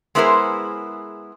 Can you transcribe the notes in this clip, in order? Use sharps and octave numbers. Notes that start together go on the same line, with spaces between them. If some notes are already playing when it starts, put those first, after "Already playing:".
G#3 B3 E4 G#4 A#4 C5